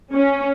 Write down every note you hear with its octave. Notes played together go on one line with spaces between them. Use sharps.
C#4